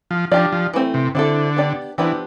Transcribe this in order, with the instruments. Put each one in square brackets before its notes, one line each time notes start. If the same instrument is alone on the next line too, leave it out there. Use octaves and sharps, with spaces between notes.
[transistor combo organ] F3
[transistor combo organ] F3 [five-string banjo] D4 G4 D5
[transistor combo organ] F3
[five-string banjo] E3 A3 C4
[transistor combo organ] C3
[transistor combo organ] D3 [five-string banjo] C4 E4 A4
[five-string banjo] B3 D4 G4 D5
[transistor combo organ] E3 [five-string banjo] F3 B3 D4 G4 B4